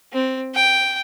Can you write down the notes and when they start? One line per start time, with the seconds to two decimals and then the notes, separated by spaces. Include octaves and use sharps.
0.13 C4
0.55 G5